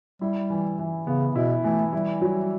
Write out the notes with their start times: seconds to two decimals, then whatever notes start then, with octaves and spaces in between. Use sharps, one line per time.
0.21 G3 E4
0.50 E3
0.79 E3
1.07 C#3 B3
1.35 B2 E4
1.64 E3 A3
1.93 G3 E4
2.21 F#3